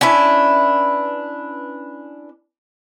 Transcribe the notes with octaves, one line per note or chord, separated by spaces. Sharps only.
C#4 D4 E4 B4